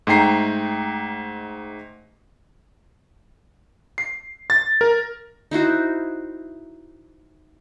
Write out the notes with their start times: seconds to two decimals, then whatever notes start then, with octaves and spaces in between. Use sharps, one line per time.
0.07 G#2 A3 D#4 G5 A#5 C7
3.98 C7
4.50 A6
4.81 A#4
5.51 D#4 E4 F#4 C5